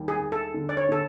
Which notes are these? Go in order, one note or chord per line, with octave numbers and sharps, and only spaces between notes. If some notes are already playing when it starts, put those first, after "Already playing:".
Already playing: D#2 G3
G#4
D#2
A4
D3
D5
C#5
D3 A4